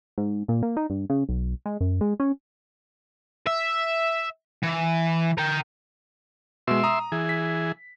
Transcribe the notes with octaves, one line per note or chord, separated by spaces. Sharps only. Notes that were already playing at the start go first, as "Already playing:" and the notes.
G#2
A#2
A#3
D#4
G2
C#3
B1
G#3
F#2
G#3
C#4
E5
E3
A#4 G5
B2 G#3 E5 C6
A#5 D#6
E3 G#4
B6